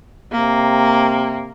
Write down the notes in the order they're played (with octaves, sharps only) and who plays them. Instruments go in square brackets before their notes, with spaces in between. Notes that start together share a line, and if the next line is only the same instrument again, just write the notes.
[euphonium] C3 [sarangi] A#3